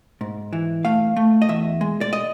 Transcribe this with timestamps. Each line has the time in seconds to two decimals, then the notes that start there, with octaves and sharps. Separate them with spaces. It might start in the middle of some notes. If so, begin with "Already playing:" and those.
0.21 G#2
0.53 E3
0.85 A3 F5
1.16 A3
1.42 D#5
1.49 E2 E5
1.81 G#3
2.01 D5
2.13 D#5